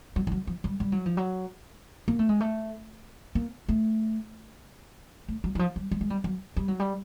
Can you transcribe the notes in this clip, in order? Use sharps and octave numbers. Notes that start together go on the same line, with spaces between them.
F#3
F3
F#3
F3
G3
G3
F#3
F3
F#3
A#3
A3
G#3
A3
A#3
A3
A3
F#3
E3
F3
G3
G3
G#3
G3
F#3
G3
F#3
G3